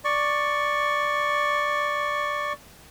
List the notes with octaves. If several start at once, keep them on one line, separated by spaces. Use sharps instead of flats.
D5 C#6